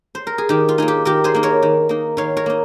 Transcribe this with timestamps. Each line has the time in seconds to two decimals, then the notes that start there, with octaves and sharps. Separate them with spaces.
0.15 C5
0.27 A#4
0.38 G#4
0.49 D#3 G4
0.69 F4
0.78 A#3 D#4 G#4
0.88 G4
1.05 D#3 G4 A#4
1.24 G#4 C5
1.34 A#3 D#4
1.43 A#4 C#5
1.62 D#3
1.89 A#3 D#4
2.17 D#3 C#5 F5
2.37 A#4 C#5
2.46 A#3 D#4